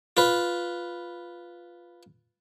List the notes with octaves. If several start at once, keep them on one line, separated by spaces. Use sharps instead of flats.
F4 B4